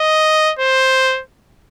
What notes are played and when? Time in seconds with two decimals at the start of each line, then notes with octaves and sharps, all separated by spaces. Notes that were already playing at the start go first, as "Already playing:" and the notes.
Already playing: D#5
0.59 C5